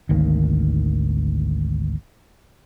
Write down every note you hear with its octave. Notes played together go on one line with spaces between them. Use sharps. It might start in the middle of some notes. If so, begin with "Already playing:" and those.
G#1 D2 D#3 A#3